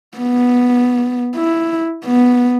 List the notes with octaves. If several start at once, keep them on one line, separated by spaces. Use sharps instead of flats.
B3
E4
B3